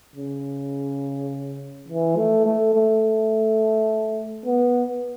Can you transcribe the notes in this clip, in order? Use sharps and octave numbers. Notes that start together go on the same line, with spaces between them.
C#3
E3
A3
A3
A3
B3